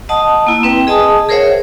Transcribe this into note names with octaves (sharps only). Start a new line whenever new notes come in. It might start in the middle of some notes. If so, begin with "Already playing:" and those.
D#5 F#5 A5 D#6
A#3 E4
C4 B4 G5
G#4 D#5 G#5 A5 D#6
G#4 A#4 C5 C#5 E5 F#5